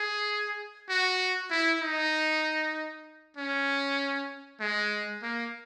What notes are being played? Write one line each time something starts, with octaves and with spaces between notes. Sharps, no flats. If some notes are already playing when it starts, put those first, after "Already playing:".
Already playing: G#4
F#4
E4
D#4
C#4
G#3
A#3